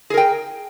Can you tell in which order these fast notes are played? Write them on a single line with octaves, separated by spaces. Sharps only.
G#4 A#4 G5